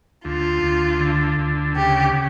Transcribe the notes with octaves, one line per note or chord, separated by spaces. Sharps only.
D2 F4
D2
D3
D2
C#3 G4
C#3